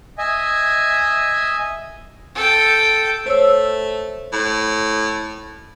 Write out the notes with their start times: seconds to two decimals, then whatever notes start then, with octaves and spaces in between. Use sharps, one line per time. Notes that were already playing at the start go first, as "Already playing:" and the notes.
0.18 D#5 E5 G#5
2.36 A4 G5
3.26 A3 C5 C#5 E6
4.33 A2